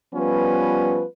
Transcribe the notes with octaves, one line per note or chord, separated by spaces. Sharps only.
F3 G3 B3 C#4 F4 B4